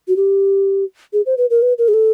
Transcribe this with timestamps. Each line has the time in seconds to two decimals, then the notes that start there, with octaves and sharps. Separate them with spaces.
0.08 F#4
0.16 G4
1.13 G#4
1.26 C5
1.38 B4
1.50 A#4
1.62 B4
1.78 A#4
1.88 G#4
1.94 A4